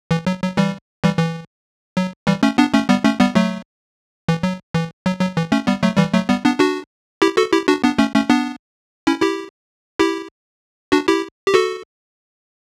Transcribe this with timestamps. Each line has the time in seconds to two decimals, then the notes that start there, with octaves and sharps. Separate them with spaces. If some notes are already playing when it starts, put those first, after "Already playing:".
0.11 E3
0.27 F#3
0.42 F#3
0.57 E3 G3
1.04 E3 G3
1.19 E3
1.97 F#3
2.27 E3 G3
2.43 A3 C#4
2.58 B3 D4
2.74 A3 C#4
2.89 G3 B3
3.05 A3 C#4
3.20 G3 B3
3.35 F#3 A3
4.28 E3
4.43 F#3
4.74 E3
5.06 F#3
5.21 F#3
5.37 E3
5.52 A3 C#4
5.67 G3 B3
5.83 F#3 A3
5.98 E3 G3
6.13 F#3 A3
6.29 G3 B3
6.45 B3 D4
6.60 D4 F#4
7.22 E4 G4
7.37 F#4 A4
7.52 E4 G4
7.68 D4 F#4
7.84 B3 D4
7.98 A3 C#4
8.14 A3 C#4
8.30 B3 D4
9.07 C#4 E4
9.22 E4 G4
9.99 E4 G4
10.92 D4 F#4
11.08 E4 G4
11.46 G4
11.54 F#4 A4